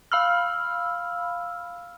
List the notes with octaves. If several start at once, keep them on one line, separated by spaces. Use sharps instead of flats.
F5 B5 E6 F6